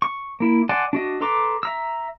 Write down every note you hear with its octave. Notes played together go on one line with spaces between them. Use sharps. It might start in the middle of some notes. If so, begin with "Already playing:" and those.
C#6
A#3 E4
D5 F#5 G#5 A5 C6
D4 F#4 D#5
A4 B4 A#5 C6 D6
E5 A#5 E6